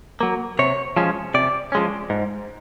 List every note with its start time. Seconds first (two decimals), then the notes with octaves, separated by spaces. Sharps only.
0.21 F#3 A#3
0.59 C3 C#5
0.97 F3 G#3 C#4
1.34 C3 D5
1.72 F3 G#3 C#4
2.10 G#2